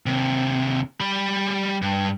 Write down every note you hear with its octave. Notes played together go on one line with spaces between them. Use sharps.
D#2 C3
G3 B5
G2